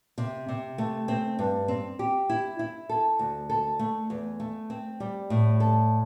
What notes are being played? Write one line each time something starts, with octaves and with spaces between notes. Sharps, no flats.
C3
C3
A3
C4
G2
C4
G4
E4
E4
A4
D2
A4
A3
E2
A3
C4
G3
A2
A4